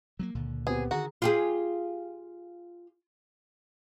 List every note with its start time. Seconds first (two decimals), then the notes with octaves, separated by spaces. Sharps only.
0.19 F#3 A3 A#3
0.35 C#2 A#2 D3
0.67 B3 C4 G4 G#4
0.91 D3 D#3 F#4 G#4 A#5
1.22 F4 G4 G#4